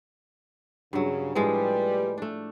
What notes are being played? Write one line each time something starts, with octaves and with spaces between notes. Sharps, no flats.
G2 C#3 F#3
A2 F3 G3 G#3 B4
A3 D4